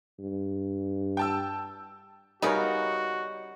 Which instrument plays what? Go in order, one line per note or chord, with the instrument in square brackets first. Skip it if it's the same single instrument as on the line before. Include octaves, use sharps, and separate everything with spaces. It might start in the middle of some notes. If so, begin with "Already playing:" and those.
[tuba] G2
[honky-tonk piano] G5 A5 E6
[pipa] C#3 B3 D#4 [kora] G3 A#4 C#5 [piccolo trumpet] F#4